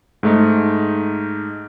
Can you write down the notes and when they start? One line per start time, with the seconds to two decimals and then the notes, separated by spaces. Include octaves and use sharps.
0.23 G#2 A3 D#4